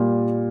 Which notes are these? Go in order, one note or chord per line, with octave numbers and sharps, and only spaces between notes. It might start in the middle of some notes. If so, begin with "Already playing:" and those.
Already playing: A#2 G3 A#3